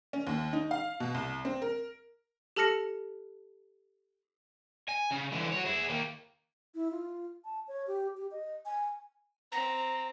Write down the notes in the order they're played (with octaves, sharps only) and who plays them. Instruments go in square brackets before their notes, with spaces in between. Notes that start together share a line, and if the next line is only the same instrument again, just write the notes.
[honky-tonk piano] C#4
D#2
D#4
F5
B2
C2
C4
A#4
[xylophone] G4 A4 A5 F6 A#6 C#7
[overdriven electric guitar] G#5
C#3
D3 E3
F#4 C#5
E4 G#4
D#3 A#3
[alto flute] E4
F4
A5
C#5
G4
G4
D#5
G#5
[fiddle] C4 [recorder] A#5